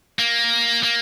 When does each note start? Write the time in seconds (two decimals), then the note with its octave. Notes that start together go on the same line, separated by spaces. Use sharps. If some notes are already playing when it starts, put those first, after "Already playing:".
0.19 A#3
0.83 A#3